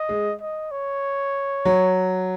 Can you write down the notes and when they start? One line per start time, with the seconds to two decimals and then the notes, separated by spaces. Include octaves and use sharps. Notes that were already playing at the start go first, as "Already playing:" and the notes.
Already playing: D#5
0.09 G#3
0.40 D#5
0.71 C#5
1.65 F#3